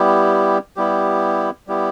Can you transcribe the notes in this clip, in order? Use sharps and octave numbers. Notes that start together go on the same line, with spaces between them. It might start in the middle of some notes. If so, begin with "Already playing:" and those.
Already playing: G3 B3 E4 G4
G3 B3 E4 G4
G3 B3 E4 G4